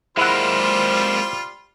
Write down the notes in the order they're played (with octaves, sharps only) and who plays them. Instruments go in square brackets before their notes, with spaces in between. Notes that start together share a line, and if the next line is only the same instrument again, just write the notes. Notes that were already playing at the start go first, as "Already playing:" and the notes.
[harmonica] G3 F4 [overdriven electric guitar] G#3 A#3 [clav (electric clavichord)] E4 F#5 [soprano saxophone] C5